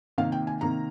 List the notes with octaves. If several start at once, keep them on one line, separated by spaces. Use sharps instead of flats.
C3 D#3 A#3 F5
G5
G#5
C3 D#3 A#3 A#5